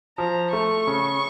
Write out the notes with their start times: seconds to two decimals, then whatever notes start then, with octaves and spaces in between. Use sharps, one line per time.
0.18 F3 A#5
0.53 A3 C#6
0.87 C#3